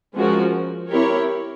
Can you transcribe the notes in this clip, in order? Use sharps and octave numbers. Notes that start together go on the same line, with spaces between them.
F3 G#3 C#4 F#4 A#4
C4 E4 G4 A#4 C#5